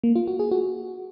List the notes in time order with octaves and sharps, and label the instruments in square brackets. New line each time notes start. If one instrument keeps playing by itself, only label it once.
[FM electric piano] A#3
F4
F#4
G#4
F#4